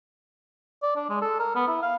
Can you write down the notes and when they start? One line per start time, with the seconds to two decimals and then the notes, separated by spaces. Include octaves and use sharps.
0.83 D5
0.96 D4
1.10 G#3
1.22 A4
1.39 A#4
1.55 B3
1.68 E4
1.82 F5